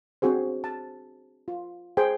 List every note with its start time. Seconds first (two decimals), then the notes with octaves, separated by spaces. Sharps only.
0.22 C4 D4 F#4 G#4 C5
0.64 A5
1.48 F4
1.97 G#4 C5 G5